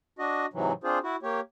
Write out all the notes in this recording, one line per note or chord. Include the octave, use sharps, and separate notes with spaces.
D4 F#4 D#5
G#2 C3 E3 F#3
C4 D4 F4 G#4 C5
E4 F#4
A#3 G4 C#5